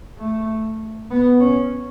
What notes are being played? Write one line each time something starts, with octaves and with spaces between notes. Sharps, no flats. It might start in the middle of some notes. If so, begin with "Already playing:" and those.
A3
B3
C#4